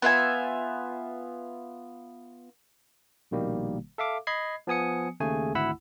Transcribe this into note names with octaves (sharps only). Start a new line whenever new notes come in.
B3 F4 E5 G#5
A#1 B2 D#3 G3 A#3
A4 E5 F5 D6
D#5 B5 G#6 C7
F3 B3 G#5 D#6 C#7
D#2 C#3 A3 G#4 G#5
G#1 D2 E4 F#5 B5 E6